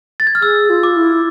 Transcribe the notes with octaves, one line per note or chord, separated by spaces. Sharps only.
A6
G#6
F6
G#4 E6
F4
D6
E4